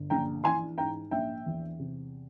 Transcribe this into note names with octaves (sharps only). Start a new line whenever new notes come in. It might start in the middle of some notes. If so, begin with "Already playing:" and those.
Already playing: G1
A#1 G5 A#5
E3 G#5 C6
G#2 G5 A#5
A#1 E5 G5
E2
C3